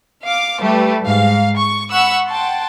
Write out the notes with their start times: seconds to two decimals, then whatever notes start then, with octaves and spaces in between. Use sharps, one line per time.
0.26 F5 D6
0.60 G3 A3 G4 B4
1.05 G#2 F5
1.59 C#6
1.91 F#5 B5 C#6 E6 F#6
2.28 F#5 G5 A5 C6